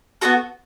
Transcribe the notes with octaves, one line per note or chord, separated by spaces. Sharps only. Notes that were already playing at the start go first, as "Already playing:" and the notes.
B3 D#4 F#4 A4